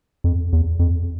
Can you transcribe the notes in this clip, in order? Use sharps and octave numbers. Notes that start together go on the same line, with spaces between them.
F2
E2
F2